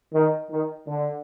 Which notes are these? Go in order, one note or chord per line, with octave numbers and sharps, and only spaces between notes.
D#3
D#3
D3